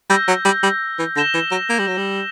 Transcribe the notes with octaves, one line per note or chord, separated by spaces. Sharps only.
G3 E6 G6 A#6
F#3
G3
G3
E3
D3 A#6 E7 G7
E3
F#3
A#3
G3
F#3
G3